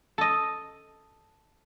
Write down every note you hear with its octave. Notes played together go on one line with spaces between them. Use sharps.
A4 D#5